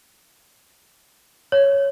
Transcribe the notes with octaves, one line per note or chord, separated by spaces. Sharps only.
C#5